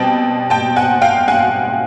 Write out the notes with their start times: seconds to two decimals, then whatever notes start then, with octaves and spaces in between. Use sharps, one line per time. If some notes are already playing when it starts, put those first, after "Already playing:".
Already playing: B2 G3 C4 G5 A5
0.50 G5 A5
0.76 F#5 G#5
1.02 F5 G5
1.28 F#5 G#5